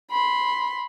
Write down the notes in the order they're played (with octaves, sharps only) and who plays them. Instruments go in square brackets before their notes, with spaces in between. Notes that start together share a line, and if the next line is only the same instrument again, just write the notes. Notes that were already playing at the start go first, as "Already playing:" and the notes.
[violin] B5 C6